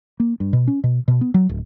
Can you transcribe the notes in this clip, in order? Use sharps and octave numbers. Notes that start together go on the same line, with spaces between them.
A#3
G2
B2
C#4
B2
B2
B3
F#3
D1